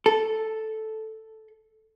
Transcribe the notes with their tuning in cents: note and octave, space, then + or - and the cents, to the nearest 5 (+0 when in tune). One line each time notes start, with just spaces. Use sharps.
A4 +0